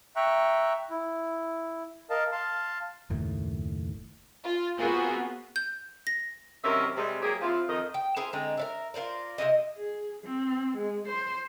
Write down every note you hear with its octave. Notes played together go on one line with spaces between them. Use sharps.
E5 G5 A#5 C#6 F#6
E4
A#4 D#5 F5 A5
F5 A5 C6
F#1 D#2 A2
F4
B3 C4 F4 F#4 G#4 A#4
G6
A#6
F#2 C3 D#3 C#4 A#4 E5
C3 G3 G#3
F#3 A#3 G4 G#4
F3 C4 E4 F4
F2 D#3 D#5
G5
E4 G#4 A#4 C5
D3 G#3 C4 A#5
A#4 D5 E5
F4 A#4 C5 D5
C3 D#4 E4 D#5
G#4
C4
G#3
C5